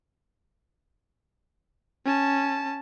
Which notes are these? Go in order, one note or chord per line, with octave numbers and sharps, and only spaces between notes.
C#4 A5